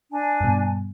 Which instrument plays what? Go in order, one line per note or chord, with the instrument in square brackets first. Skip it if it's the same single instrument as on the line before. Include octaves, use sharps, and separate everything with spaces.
[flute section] D4 G#5
[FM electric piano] G2 B2